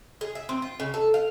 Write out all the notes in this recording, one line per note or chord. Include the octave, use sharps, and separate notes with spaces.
G#4
E5
C4
F4
C#3
A4
F5